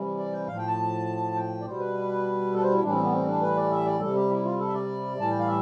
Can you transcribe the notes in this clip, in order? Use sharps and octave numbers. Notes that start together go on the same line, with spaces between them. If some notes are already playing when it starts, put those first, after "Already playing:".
Already playing: C3 E3 G3
D5
G5
A2 F3 F5
G5
A5
G5
D5
B2 G3 C5
B4
A4 B4
C5
E4
A2 E3 G3 D4
C4
B3
C4
D4
B4
D5
E5
D5
C3 G3 A4
G4
E4
F4
A4
E5
D5
A2 E3 G3 A5
G5
F5
E5